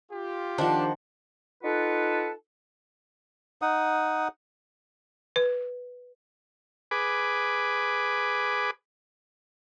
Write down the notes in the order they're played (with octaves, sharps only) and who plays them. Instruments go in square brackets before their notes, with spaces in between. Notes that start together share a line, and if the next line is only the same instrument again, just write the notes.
[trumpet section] F4 G4
[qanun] D#3 F3 [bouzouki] D4 [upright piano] C5 F#5
[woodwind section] D#4 F4 A4 B4 F#5 A5
[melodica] D#4 F#5 D#6
[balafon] B4
[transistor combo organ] G#4 B4 D6